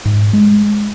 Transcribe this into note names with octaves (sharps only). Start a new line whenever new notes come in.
G#2
G#3